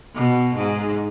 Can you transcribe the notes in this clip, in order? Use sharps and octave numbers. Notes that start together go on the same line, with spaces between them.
B2
G#2